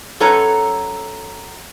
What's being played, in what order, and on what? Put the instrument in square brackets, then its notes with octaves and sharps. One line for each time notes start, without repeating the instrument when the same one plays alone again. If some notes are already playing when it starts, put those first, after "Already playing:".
[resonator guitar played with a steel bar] F#2 A4 B4 C#5 A#5